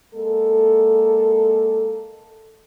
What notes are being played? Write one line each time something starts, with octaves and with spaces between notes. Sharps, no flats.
G#3 A#3 A4